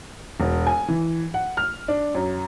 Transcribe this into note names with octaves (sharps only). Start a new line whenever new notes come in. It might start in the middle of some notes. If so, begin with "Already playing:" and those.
E1
G#5
E3
F#5
F6
D4
F#2